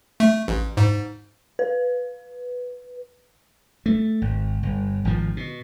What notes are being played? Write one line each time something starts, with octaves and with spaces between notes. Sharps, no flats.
A3
A1
G#2
B4
A3
G#1
G1
G#1 D#3 F3
B2